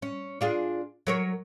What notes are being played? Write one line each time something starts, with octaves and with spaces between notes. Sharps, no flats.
C#4
D4 F4 G#4
F#3 A#4 C#5